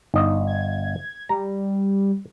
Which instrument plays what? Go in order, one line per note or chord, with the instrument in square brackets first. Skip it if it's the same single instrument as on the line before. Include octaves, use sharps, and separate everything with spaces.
[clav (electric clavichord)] G1 D#5 [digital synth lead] D#4
[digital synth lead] G#6
[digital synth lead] G3 [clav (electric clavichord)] A#5